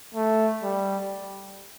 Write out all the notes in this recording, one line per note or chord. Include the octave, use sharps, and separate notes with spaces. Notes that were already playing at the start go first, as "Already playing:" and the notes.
A3
G3